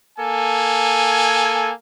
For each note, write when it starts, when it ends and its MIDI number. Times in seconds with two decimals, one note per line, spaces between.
0.19 1.72 58
0.19 1.72 69
0.19 1.72 80